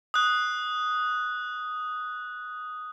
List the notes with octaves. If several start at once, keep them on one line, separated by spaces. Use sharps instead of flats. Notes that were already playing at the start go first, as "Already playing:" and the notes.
D#6 F#6